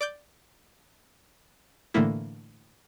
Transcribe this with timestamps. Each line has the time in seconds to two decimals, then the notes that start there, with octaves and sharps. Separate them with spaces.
0.01 D5 D6 G6
1.94 A2 D3 E3 A3 A#3 E4